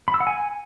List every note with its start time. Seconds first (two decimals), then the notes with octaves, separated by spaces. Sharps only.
0.08 B5
0.14 E6
0.20 F#5
0.27 G#5